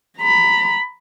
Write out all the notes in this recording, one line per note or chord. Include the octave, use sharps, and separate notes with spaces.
A#5 B5